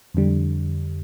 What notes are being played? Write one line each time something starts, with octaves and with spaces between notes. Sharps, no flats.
F2 D3 G3